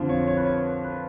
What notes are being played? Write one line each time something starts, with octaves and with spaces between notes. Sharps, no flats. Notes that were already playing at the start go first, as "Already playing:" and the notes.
Already playing: F2 D3 F3
C#5
C#5
B4
C#5
B4